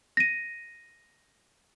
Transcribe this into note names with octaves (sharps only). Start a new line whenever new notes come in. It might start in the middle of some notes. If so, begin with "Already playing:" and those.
A#6 D#7